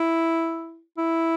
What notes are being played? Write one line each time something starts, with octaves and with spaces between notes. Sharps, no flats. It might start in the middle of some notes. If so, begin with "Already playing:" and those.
Already playing: E4
E4